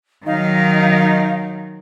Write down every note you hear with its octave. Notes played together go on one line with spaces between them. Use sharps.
D#3 F#3 D#4 F5